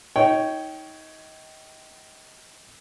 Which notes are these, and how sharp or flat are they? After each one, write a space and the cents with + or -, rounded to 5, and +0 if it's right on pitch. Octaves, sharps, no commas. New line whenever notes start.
D#4 +25 C#5 +5 G5 -15